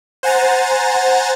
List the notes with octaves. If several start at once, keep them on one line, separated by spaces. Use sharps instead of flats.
C5 F#5 G#5 A#5 A6